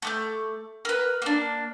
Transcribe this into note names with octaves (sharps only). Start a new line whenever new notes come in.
A3 D6 G6
A#4 B4
A#3 D4